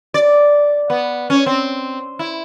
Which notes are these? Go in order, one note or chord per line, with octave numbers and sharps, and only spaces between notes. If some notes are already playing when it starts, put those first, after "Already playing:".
D5
B3
C#4
C4
E4